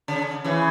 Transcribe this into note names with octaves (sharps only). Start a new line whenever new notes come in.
C#3
C#3 E3